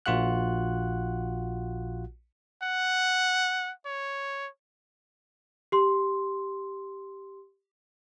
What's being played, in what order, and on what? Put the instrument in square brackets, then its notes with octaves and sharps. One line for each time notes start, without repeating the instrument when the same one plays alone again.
[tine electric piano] A#1 F4 F#4 F#5 F#6
[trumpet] F#5
C#5
[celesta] G4 C6